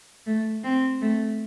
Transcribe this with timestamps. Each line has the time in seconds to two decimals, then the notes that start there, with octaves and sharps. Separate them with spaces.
0.27 A3
0.64 C4
1.02 A3